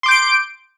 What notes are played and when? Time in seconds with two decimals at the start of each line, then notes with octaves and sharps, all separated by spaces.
0.03 C6
0.06 D6
0.08 G6
0.11 D7